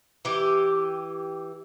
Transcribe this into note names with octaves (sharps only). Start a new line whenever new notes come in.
E3 G4